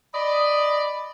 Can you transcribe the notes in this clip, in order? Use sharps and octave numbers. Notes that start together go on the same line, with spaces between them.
D5 D#5 B5